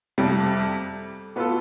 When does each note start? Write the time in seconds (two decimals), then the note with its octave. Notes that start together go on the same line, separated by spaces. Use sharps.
0.18 F2 C3 G3
1.36 B2 B3 F4 A4